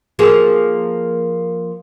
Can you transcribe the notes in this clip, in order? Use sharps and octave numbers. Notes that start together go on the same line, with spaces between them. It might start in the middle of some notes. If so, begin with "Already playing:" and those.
F3 A#3 G#4